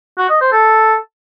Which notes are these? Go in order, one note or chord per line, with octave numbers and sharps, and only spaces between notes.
F#4
D#5
C5
A4